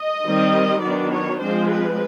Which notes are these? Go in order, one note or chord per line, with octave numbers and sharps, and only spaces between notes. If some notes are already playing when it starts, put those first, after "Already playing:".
Already playing: D#5
D#3 G3 C4
D#3 F#3 B3 D4 D5
C#5
F3 G#3 C4 C5
B4